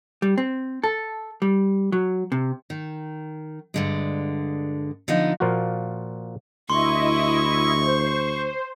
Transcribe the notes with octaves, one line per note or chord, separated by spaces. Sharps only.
G3
C4
A4
G3
F#3
C3
D#3
G2 D3 G#3
D3 F3 B3 D#4
A#2 F3 A#3 F4 F#4
D2 E4 D#5 C6 C#6
C5